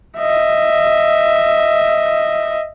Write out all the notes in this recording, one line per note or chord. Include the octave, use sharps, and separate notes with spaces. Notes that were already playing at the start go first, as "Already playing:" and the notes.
D#5 E5